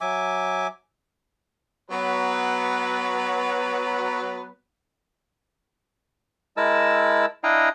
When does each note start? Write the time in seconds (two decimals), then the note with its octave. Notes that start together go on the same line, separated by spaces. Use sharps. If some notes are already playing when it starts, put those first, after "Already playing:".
0.01 F#3 E5 G#5 D6
1.91 F#3 B3 B4
6.57 G#3 E4 A#4 A5 E6
7.44 D4 E4 D#5 F5 G5 A#5